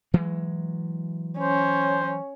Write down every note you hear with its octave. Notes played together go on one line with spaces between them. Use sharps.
E3 F#3 G#3
C#4 C5